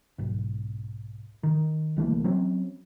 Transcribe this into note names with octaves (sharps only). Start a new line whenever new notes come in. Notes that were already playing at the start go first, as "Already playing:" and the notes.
B1 G#2
D#3
C2 E3 A3 A#3
F#3 C4 C#4